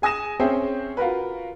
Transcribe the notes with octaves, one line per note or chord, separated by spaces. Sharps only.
G#4 G#5 D#6 A#6 E7
C4 C#4 G#4 C5 E5 G5
F4 F#4 A#4 B4